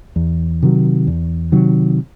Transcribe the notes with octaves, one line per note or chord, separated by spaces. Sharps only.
E2
C3 D#3 F#3
E2
C3 D#3 F#3